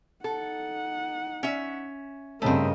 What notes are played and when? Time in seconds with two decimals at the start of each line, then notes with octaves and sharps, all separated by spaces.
0.24 D#4 A4 F#5
1.43 C#4 E5
2.42 G2 C#3 A3 C4 A#4 D#5